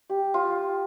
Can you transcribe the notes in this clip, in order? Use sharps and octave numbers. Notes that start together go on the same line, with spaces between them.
G4
F4